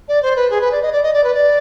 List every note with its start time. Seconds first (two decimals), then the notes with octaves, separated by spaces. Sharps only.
0.08 D5
0.22 C5
0.36 B4
0.50 G#4
0.61 B4
0.71 D5
0.82 D#5
0.92 D5
1.03 D#5
1.13 D5
1.23 B4
1.34 D5